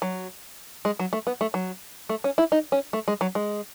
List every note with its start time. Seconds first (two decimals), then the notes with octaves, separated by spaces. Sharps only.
0.02 F#3
0.85 G#3
0.99 F#3
1.13 A3
1.27 B3
1.41 A3
1.54 F#3
2.09 A3
2.24 C#4
2.38 E4
2.52 D#4
2.72 C#4
2.93 A3
3.08 G#3
3.21 F#3
3.35 G#3